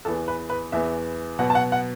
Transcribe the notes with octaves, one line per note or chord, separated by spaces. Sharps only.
E2 E3 B3 A4
B4
B4
E2 E3 B3 E5
B2 F#3 B3 F#5
A5
F#5
F#5